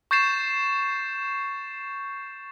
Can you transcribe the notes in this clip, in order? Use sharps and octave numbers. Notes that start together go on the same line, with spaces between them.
C#6 G6 A6 C7 E7